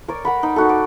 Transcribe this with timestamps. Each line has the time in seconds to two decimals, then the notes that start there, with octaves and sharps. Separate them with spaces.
0.08 A#4 C#5 D5
0.25 A#4 F#5 B5
0.43 D#4
0.56 D#4 F#4 A4
0.69 D5